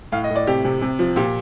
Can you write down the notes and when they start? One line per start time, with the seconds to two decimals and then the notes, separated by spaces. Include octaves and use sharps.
0.12 A2 F5
0.24 D#5
0.30 A2
0.35 D5
0.47 C3 G4
0.64 C3
0.81 C3
0.99 F3
1.16 A#2 G4